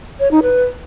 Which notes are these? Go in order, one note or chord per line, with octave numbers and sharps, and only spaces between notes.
C#5
D#4
B4